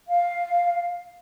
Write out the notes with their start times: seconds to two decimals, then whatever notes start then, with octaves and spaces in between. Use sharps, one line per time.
0.08 F5